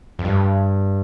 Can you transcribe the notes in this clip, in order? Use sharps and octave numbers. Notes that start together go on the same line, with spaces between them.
F2
G2